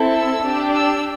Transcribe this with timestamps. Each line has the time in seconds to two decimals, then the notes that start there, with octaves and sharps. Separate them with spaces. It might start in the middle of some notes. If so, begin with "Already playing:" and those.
Already playing: C4 E4 A4
0.12 E6
0.43 D4 G4
0.75 E6